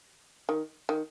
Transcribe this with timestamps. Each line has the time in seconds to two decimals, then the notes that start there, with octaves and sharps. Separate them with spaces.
0.49 D#3
0.89 D#3